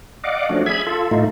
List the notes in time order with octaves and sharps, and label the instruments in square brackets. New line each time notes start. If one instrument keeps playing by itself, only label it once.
[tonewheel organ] D5 D#5 F5 F#5 D6
F3 A3 C#4 D4 F#4
G#4 E5 B5 G#6
F4 A4
A2 A3 D#4 F4